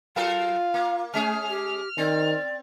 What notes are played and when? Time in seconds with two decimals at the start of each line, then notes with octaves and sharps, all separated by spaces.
0.16 F#3 F4 A4 A#4 F5
0.74 A#3
1.14 G#3 A3 C#4 G#4 F6
1.49 G4
1.98 D#3 C4 D5